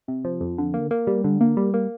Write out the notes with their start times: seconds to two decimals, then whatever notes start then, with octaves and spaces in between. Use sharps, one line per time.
0.08 C3
0.25 F3
0.41 F2
0.58 D3
0.74 A#3
0.91 A#3
1.07 G3
1.24 D3
1.41 A#3
1.57 G3
1.74 A#3